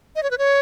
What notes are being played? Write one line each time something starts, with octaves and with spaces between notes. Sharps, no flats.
D#5
C#5
B4
C#5